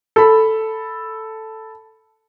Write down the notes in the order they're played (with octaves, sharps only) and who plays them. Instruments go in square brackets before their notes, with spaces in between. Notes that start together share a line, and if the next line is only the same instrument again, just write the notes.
[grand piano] A4 B5